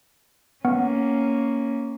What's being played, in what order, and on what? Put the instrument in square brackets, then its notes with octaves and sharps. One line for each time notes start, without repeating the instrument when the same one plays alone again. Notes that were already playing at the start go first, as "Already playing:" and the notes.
[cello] A#3 C#4 [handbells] B3